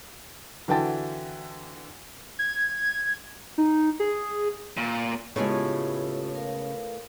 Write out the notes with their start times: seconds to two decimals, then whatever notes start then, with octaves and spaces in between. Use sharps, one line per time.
0.68 D3 E3 F#4 G5 A5 A6
2.39 G#6
3.58 D#4
4.00 G#4
4.77 A#2
5.36 A2 C#3 G#3 B3 F4 G4 G#5
6.35 A#4 F5